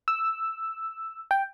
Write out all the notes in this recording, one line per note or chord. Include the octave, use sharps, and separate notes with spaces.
E6
G5